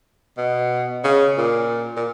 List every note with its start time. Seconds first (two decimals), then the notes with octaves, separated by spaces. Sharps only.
0.37 B2
1.04 C#3
1.38 A#2
1.97 A#2